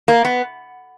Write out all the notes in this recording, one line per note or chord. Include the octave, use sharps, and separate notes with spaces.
A#3
B3